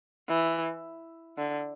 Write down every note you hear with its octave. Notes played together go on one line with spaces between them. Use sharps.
E3
D3